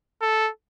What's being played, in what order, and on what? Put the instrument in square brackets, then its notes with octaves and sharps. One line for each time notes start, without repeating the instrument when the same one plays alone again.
[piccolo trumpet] A4